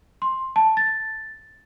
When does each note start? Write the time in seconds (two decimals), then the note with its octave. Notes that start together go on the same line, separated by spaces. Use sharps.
0.22 C6
0.56 A5
0.77 A6